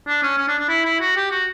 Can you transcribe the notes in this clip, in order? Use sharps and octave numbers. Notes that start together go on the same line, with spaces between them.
D4
C#4
C#4
D4
D4
E4
E4
F#4
G4
F#4